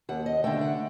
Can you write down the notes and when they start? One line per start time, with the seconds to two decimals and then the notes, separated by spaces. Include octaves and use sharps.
0.09 D#2 F#5
0.26 D#5
0.44 D3 A3 G5
0.61 F#5